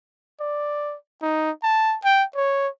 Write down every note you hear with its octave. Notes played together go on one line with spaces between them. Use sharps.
D5
D#4
A5
G5
C#5